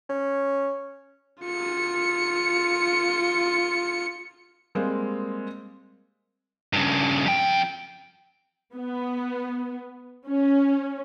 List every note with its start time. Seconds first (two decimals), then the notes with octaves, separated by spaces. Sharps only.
0.09 C#4
1.43 F4 C#7
4.75 G3 G#3 A#3 C4
6.73 G2 C#3
7.26 F2 G5
8.76 B3
10.27 C#4